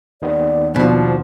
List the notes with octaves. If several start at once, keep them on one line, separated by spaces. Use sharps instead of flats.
D#2 D#3 B3 D5
B2 F3 D4 C5